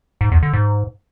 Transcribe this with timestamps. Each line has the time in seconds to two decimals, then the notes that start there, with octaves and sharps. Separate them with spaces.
0.21 G#2
0.32 E2
0.43 D3
0.53 G#2